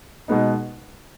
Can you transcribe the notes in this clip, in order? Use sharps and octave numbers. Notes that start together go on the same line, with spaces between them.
B2 G#3 B3 D#4